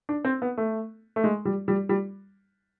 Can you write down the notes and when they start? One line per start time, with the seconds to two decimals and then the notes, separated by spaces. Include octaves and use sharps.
0.09 D4
0.25 C4
0.42 B3
0.57 A3
1.16 A3
1.24 G#3
1.45 G3
1.68 G3
1.89 G3